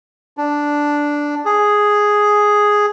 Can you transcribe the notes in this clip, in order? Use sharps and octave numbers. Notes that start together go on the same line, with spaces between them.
D4
G#4